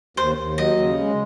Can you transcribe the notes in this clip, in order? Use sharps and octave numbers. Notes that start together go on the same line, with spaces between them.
D#2 C5
D#2
F#3 D#5
C#3
G#3